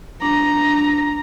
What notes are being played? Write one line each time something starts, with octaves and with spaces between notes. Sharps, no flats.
D4 A#5